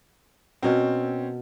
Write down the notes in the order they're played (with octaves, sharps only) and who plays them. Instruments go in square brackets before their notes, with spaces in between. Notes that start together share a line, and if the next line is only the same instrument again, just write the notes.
[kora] B2 A#4 [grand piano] C4 C#4